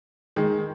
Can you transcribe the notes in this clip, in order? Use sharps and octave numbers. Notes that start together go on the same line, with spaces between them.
D#3 G#3